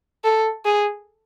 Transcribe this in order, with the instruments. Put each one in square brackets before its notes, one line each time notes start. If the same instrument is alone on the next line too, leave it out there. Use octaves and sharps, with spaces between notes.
[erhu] A4
G#4